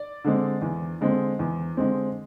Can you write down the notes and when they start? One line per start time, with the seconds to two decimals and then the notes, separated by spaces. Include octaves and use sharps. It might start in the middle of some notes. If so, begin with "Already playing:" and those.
Already playing: D5
0.24 D3 G#3 C4
0.62 E2
1.01 D3 G#3 C4
1.39 E2
1.77 D3 G#3 C4